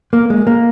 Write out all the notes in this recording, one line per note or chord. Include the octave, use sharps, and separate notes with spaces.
A#3
G#3
A#3